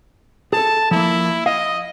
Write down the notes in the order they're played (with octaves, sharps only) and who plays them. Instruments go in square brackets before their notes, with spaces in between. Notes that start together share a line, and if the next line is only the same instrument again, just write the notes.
[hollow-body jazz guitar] G#4 A4 [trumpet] A5
[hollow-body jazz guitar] F3 A#3 [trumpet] E4
[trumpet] D#5 [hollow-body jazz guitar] F5